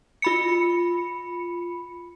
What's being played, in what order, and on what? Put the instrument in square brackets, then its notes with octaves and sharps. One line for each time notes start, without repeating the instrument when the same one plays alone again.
[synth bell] F4 B5 C#7